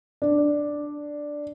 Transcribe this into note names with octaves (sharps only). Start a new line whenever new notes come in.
D4